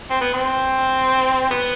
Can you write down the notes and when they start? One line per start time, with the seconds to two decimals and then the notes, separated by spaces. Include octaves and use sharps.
0.10 C4
0.21 B3
0.34 C4
1.51 B3